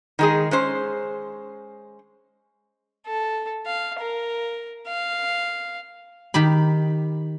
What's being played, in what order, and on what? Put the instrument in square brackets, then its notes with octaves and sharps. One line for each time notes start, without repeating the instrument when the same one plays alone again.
[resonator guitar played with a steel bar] D#3 G#3 G#4
G#3 C#4 C5
[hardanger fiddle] A4
F5
A#4
F5
[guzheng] D#3 G4 B5